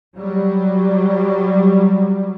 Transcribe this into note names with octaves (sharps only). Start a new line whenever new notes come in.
F#3 G3